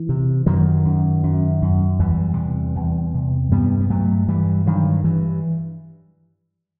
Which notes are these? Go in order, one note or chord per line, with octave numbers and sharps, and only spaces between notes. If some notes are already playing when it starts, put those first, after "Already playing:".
Already playing: E3
C3
F#2 D#3 F#3
F#2
F#2
F#2
E2 E3 G3
C3
E2
C3
G2 G3 B3
B3
G2 F#3 A3
G2 E3 G3
G2 D#3 F#3
G2 E3